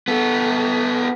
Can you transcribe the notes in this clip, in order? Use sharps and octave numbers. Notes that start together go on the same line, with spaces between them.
B3 A4